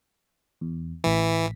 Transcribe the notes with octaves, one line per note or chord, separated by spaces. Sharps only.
E2
A1 E3 B6